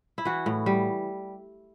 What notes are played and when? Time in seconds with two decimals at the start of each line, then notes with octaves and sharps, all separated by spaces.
0.18 E4
0.25 E3 F#4
0.46 A2
0.66 G3